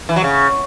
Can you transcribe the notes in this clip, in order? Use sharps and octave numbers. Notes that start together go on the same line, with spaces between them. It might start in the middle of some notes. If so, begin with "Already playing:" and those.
E3
F#3
C#3